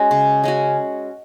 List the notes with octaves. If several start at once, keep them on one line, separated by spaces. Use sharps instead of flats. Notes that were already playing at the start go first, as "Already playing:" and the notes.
Already playing: G#3 C#4 F#4
C#3
G#3 C#4 F#4